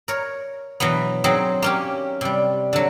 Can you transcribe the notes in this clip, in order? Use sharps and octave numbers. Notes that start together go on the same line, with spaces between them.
A#4 C#5
B2 E3 F#3 B3
F#3 C4 D#4 G#4
A#3 C#4 G4
C3 G3
D3 F#3